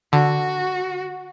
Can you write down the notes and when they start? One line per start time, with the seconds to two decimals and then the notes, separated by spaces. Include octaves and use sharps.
0.13 D3 F#4